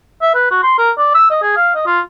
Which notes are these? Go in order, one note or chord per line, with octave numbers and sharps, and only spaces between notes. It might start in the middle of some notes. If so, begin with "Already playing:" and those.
E5
B4
F#4
C6
A#4
D5
E6
D#5
G#4
F5
D#5
F4